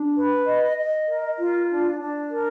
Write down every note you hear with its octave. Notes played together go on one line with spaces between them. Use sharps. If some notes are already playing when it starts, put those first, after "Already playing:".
Already playing: D4
B4
D#5
D#5
A#4
F4
D4
D4
A#4